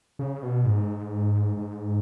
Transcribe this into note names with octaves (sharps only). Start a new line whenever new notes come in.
C#3
B2
G#2
G#2